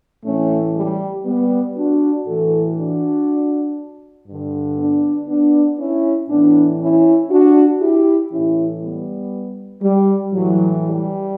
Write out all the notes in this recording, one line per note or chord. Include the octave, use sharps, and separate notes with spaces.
A2 E3 A3 C#4
G3
G3 B3
D4 F#4
A2 E3 F#4 A4
D4 F#4
G2 D3
B3 D4
B3 D4
C#4 E4
A2 E3 B3 D4
C#4 E4
D4 F#4
E4 G4
A2 E3 C#4 E4
G3 B3
G3
A2 E3 F#3
G3